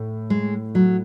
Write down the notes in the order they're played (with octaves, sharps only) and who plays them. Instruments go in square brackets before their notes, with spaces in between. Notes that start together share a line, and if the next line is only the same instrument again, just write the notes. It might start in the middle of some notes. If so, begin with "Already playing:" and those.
Already playing: [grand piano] A2
[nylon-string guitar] G#3
F#3